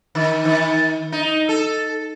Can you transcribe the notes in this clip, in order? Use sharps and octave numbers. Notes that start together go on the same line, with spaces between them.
D#3
D#3
D#4
A4